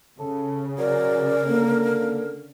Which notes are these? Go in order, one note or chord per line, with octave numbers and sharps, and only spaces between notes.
C#3 A4
F#3 A#4 D5
D3 A#3